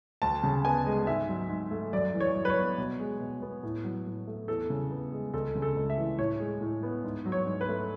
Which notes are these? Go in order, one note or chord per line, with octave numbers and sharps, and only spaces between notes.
D2 A5
C#3
B3 G#5
G#3
G#2 E5
F#3
G#2
A3
F#2 D5
E3
C#5
F#2
B4
C#5
B3
B2
G#3
B2
B3
A2
F#3
A2
A3
E2 A4
C#3
B3
G#3
C#2 A4
C#3
A4
C#2
E5
E3
A2 C#5
G#3
A2
B3
G#2
F#3
C#5
G#2
B4
A3